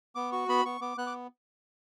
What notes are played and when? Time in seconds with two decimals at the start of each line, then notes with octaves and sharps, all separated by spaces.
0.15 B3 D6
0.32 F#4 C#6
0.49 B3 B5
0.65 B3 C#6
0.81 B3 D6
0.97 B3 F#6
1.07 D6